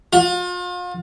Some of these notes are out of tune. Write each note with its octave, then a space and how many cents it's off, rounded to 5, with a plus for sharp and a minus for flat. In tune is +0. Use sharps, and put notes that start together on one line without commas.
F4 +40